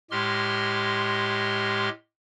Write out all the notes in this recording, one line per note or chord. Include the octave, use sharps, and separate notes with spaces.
A2 G#3 G4 C6 F6